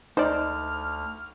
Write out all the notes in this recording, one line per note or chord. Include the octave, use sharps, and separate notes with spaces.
D2 D#4 C5 D5 F6